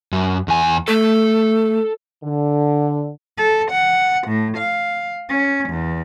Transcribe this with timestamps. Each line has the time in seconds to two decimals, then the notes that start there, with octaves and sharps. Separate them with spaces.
0.13 F#2
0.48 E2 G#5
0.88 A3 A4
2.24 D3
3.38 A4
3.71 F#5
4.27 A2
4.57 F5
5.29 C#4
5.69 E2